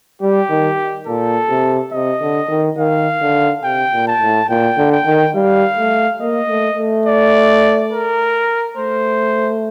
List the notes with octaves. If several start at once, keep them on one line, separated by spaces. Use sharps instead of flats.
G3 G4
D#3
A#2 A4
C3
C3 D#5
D3
D#3
D#3 F5
D3
C3 G5
A#2
A5
A2
A#2 G5
D3
G5
D#3
G3 F5
A3
A#3 D#5
A3
A3
D5
A#4
A3 C5